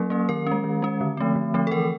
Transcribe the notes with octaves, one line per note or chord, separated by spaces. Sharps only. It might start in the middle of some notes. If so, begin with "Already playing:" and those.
Already playing: F#3 A#3 C#4 A4
A#3 C#4
D#3 A#4
G#3 C#4
D#3
G#3 C#4
D3
F3 A3 C4
D3
F3 A3 C4
A4
E3 A#4